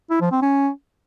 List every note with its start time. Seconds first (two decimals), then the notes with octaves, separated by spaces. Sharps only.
0.11 E4
0.21 F3
0.31 C4
0.42 C#4